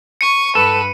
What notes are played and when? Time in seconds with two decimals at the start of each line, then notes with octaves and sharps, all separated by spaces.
0.21 C#6 C#7 D#7
0.55 G2 A4 B4